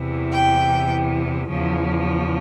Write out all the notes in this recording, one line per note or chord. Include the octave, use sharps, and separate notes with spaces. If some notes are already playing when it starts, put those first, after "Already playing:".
Already playing: E2 C3 E3
G5
E2 C#3 F3